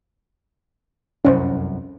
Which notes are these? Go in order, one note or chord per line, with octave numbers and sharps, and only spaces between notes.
F1 C2 F#2 C#4 C5